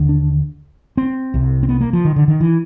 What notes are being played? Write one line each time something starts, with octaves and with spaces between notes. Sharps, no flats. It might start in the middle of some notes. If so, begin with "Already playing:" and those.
Already playing: D#2 D3
D4
C4
C2 C3
C4
B3
A#3
F3
D#3
D3
D#3
E3